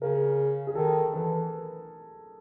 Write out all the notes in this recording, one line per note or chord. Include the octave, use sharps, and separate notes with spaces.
C#3 A#4
G#4
D#3 A4
E3 A4